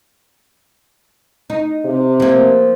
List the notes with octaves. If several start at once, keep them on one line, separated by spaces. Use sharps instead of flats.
D#4
C3
F3 A#3